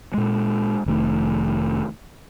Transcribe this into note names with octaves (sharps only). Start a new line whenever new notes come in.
A#2 G#3
F1 D#3 A3